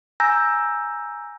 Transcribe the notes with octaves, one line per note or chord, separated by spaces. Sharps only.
G#5 A#5 E6 G6 A#6